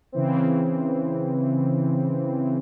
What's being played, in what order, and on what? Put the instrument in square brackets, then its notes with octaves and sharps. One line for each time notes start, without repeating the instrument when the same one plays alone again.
[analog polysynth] C#3 E3 C4